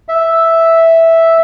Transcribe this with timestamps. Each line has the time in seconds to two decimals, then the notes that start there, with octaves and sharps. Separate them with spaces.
0.08 E5